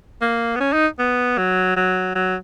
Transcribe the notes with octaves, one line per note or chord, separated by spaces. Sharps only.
A#3
B3
C#4
D#4
B3
F#3
F#3
F#3